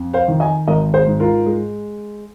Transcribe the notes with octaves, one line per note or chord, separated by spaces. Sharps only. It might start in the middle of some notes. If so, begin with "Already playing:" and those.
Already playing: F2
C5 F5
D#3
D#5 G#5
G#1 A#4 D#5
G#4 C5
G#2
F4 A#4
G#3